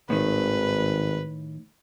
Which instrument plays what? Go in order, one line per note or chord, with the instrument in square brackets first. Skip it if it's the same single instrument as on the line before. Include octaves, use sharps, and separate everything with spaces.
[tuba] G#1 [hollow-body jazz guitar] A2 D#3 [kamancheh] B4